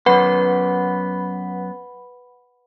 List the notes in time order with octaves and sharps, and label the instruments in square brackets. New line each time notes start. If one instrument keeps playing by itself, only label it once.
[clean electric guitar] F#2 B3 [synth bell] B4 F#5 B5